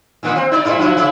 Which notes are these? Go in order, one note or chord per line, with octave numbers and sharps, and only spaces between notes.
A#2 D#3 A#3
C4
D#4 D5
G2 A#2 E4
F3 F#3 E4
C#3 E4